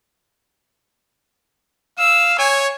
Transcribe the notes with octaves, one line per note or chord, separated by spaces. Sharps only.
F5 E6
C#5 G#5